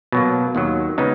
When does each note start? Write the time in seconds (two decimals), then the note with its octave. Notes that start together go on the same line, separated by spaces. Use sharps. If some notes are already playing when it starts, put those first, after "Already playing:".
0.12 B2 F#3 A#3
0.55 D#2 D#3 F#3
0.98 C#3 G#3 B3 D#4